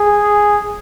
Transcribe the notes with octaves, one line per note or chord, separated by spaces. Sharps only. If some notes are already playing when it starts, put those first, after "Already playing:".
Already playing: G#4